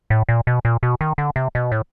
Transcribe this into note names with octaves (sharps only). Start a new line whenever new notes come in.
A2
A#2
B2
A#2
B2
D#3
D3
C3
B2
A2